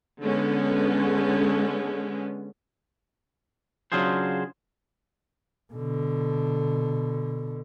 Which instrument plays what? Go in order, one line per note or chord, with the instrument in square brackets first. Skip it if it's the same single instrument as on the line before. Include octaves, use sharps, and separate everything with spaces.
[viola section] D3 G#3 B3 C#4
[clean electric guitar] C#3 F#3 D4 F4 G#4 C5
[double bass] B2 D3